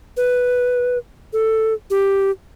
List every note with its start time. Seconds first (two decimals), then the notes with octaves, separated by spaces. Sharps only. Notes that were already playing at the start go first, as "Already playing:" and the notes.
0.17 B4
1.33 A4
1.90 G4